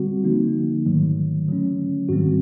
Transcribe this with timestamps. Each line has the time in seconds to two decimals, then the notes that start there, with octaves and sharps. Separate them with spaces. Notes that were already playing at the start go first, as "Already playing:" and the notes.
Already playing: D3 G3 C4 F#4
0.24 D3 F3 A#3 D#4
0.86 G#2 D#3 F#3 A3
1.48 D3 F#3 A3 C#4
2.09 G#2 D#3 G3 C4 F#4